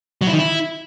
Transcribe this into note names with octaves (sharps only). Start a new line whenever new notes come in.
F#3
E4
D#3
E4